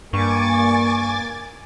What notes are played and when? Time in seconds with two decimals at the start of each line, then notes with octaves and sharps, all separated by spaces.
0.13 G2 A#3 G#5 C#6 D6 A6